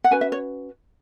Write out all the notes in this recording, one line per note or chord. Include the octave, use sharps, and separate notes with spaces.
F#5
C#4 F#4 B4 G#5
E5
C#5